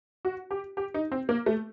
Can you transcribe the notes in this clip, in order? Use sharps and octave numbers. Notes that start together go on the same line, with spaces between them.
F#4
G4
G4
D#4
C4
A#3
A3